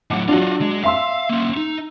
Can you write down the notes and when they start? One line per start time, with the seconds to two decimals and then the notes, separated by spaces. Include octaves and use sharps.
0.11 A2 F#3 F#5 D6
0.28 F#3 D4 F4 F#4
0.61 G#3
0.84 E5 F5 C6 E6
1.29 A#3 C#4
1.57 D#4